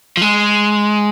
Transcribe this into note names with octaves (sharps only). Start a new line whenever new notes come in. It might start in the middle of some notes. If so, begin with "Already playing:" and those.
F3
G#3